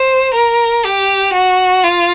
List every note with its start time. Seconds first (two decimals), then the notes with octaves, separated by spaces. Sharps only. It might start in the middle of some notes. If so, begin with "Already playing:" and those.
Already playing: C5
0.34 A#4
0.84 G4
1.33 F#4
1.84 F4